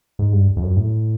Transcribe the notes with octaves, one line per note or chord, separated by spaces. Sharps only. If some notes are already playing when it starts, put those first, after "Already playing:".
G#2
G2
F2
F#2
A2